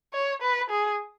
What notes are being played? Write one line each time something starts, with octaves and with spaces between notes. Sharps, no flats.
C#5
B4
G#4